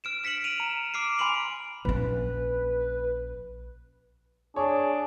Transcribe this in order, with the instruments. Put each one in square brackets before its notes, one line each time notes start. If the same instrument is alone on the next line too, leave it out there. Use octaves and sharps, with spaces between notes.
[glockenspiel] F6 D7 E7
F6 B6 C#7 D7 F#7
D#7 F7
A#5
D6 F6 C7 D7
G#5 B5 C6 D7 F#7
[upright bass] A#1 C#4 [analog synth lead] B4
[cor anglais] D4 [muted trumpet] G#4 [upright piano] C#5